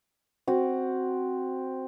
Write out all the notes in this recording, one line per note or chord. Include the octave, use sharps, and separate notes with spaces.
C4 F#4